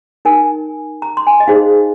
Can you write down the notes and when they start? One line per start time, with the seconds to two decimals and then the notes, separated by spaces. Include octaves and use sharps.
0.25 D#4 A#4 G#5
1.02 A#5
1.17 C6
1.27 G#5
1.40 D#5
1.48 D#4 G#4 C5 F5